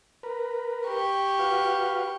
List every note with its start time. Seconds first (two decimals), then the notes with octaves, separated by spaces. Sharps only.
0.23 A#4 B4
0.87 G4 C#6
1.39 F#4 B4 F5